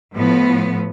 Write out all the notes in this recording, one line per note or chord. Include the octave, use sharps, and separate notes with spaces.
A2 F3 B3